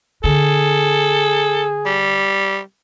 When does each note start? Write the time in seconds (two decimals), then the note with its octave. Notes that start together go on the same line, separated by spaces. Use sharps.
0.24 D3 G#4 A4
1.86 G3